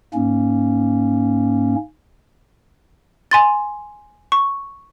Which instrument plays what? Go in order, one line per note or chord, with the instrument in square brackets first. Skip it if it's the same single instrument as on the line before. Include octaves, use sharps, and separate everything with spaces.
[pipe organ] G#2 A#3 C#4
[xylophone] G#5 C6 A6
C#6